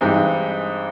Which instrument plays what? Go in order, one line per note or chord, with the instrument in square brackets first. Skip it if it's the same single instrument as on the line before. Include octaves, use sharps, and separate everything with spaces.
[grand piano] G2 E3 G#3 C4 D#4